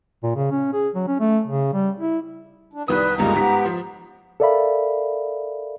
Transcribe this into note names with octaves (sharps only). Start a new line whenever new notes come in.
A#2
C#3
C#4
G#4
F#3
C#4
A3
C#3
G3
E4
D4
C2 D#3 G3 B4 D#6
G1 C#2 G2 G#3 A#3 D#4 A#5
G#2 B3 G4 B6
F3 C5
A4 A#4 D5 E5 F5 B5